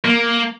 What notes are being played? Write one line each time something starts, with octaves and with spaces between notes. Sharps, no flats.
A#3